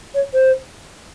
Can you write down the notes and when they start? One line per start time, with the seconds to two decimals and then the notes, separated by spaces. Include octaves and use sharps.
0.14 C#5
0.33 C5